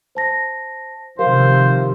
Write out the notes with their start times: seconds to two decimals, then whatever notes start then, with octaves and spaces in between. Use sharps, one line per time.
0.15 C5 A5 A#6
1.19 C3 D#3 F3 G4 A#4 C5 F5